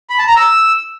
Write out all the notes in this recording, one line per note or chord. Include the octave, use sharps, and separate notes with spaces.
B5
A5
A#5
E6